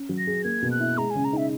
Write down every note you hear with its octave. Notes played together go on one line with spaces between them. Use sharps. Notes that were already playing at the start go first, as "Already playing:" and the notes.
Already playing: C#4
F#3
A#6
G#4
A#3 G#6
B2
F#6
E4
G#3 A#5
C#3 G#5
A#5
D#4 E5